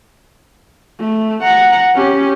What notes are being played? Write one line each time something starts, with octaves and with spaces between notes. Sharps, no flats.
A3
F#5 A#5
C#4 G4